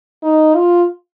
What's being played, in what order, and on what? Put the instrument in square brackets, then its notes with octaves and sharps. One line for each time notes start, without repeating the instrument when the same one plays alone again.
[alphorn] D#4
F4